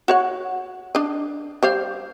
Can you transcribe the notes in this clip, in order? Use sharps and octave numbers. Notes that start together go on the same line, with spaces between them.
F#4 C#5 F#5
D4 D#5
G3 C5 F5